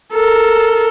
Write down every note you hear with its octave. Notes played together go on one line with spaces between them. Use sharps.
A4 A#4